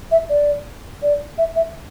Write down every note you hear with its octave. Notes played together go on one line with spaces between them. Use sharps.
E5
D5
D5
E5
E5